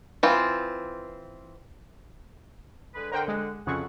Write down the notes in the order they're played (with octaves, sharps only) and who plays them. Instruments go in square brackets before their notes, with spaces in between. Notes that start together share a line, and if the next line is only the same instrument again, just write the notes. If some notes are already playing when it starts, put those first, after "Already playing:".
[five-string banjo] E3 C4 F4
[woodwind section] D3 G#3 B4
[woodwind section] D3 F#5 [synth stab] A#4 C5 G5
[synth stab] G#3
[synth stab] F2 C#3 C#6 [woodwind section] F#4 A4 F#5